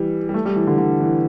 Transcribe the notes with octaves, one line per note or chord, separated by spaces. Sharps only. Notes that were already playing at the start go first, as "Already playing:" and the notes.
Already playing: E3 G3
G3
A3
G3
E3
D3
D3
E3